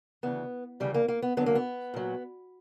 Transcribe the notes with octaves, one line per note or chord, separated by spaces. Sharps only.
D2 C#3 E3 B3
D2 C#3 E3 G3
A#3
A#3
B3
E2 D3 F#3 B3
A#3
B3
A#2 F#3